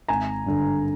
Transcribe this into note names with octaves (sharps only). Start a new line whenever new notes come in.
G#1 G#5 A#5
G2 D3